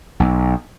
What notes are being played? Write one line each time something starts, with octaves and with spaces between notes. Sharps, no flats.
B1